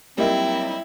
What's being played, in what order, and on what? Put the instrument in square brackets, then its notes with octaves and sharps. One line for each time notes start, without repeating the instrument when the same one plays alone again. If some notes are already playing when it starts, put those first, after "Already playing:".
[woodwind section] A#2 F#3 C4 [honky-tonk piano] G3 A#3 D#4 [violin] E4